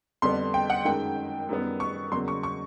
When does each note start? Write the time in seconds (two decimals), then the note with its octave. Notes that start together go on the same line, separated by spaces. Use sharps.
0.22 F2 D3 G3 B3 D4 C6
0.54 G5
0.70 F#5
0.85 F#2 D#3 G#3 G5
1.49 F#2 D#3 G3 B3
1.80 C#6
2.12 E2 C#3 F#3 A#3 C6
2.28 C#6
2.43 C#6